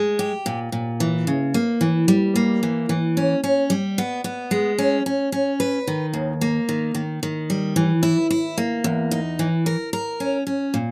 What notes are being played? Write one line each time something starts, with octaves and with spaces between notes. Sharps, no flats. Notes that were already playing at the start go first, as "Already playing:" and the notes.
Already playing: G#3
G4
A#2
A#2
E3
C#3
A#3
E3
G3
A#3
E3
E3
C#4
C#4
G3
B3
B3
G#3
C#4
C#4
C#4
B4
D#3
D#2
A#3
D#3
D#3
D#3
G3
E3
E4
E4
A#3
E2
D#4
E3
A#4
A#4
C#4
C#4
A#2